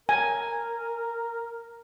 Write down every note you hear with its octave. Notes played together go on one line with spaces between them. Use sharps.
A#4 G#5